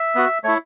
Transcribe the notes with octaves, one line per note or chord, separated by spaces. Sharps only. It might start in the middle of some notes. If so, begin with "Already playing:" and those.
Already playing: E5
B3 F#4
A3 E4 C#5